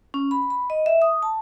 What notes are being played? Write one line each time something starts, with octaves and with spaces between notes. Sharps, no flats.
C#4
B5
B5
D#5
E5
D#6
A5